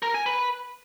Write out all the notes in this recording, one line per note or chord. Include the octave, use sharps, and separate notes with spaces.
A#4
G#5
B4